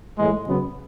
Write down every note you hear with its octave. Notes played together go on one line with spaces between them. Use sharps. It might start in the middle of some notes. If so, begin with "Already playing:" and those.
A2 E3 G#3
C#3 F#3 B3